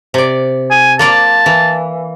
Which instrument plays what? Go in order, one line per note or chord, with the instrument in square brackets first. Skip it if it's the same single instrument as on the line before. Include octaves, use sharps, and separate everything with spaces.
[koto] C3 D5
[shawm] G#5
[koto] A#3 F4 D5 [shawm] A5
[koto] E3